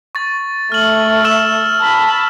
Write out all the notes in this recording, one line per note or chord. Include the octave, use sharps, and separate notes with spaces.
C#6 A6
A3 F6 F#7
E6 F6 E7
A5 B5